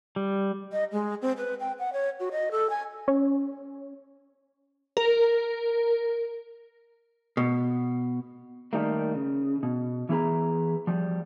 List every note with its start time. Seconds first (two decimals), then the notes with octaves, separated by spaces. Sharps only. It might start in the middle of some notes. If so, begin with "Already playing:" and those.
0.16 G3
0.72 D#5
0.92 G#3
1.22 C4
1.37 B4
1.60 G5
1.79 F#5
1.93 C#5
2.20 F#4
2.32 D#5
2.52 A4
2.70 G#5
3.08 C#4
4.97 A#4
7.37 B2
8.73 D#3 G3 A3 A#3
9.14 C#3
9.63 B2
10.09 E3 B3 E4 G#4 B4 A#5
10.87 F3 G3